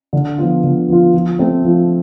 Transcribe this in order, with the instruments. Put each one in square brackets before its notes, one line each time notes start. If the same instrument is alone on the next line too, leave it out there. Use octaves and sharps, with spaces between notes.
[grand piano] D3
F3 B3 F4
D3
F3 B3 F4
F3
A3 C4
F3